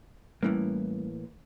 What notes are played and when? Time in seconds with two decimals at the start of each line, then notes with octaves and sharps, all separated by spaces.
0.43 A2 E3 G3 A3 A#3 C#4